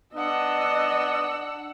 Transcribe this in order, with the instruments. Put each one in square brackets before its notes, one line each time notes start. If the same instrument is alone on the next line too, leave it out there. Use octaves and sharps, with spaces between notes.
[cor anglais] B3 [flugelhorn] D4 [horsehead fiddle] D#5 [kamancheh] F#5 E6